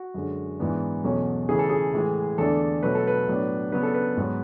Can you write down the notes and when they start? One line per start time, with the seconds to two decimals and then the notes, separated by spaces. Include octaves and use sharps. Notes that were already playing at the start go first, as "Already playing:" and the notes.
Already playing: F#4
0.14 F#2 D3 G#3
0.59 G#2 E3 B3 D4
1.04 E2 B2 F#3 A3 C#4
1.49 C#3 E3 A3 C#4 G#4
1.59 A4
1.70 G#4
1.94 A2 E3 G#3
2.38 E2 D3 A3 D4 A4
2.83 B2 F#3 A3 B4
2.95 A4
3.07 B4
3.28 A2 F#3 B3 D4
3.72 C#3 F#3 B3 D4 B4
3.83 A4
3.94 B4
4.17 G#2 F#3 B3